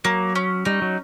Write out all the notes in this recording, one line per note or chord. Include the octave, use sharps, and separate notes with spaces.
F#3 A#3
C#4
G3 D#4
F#3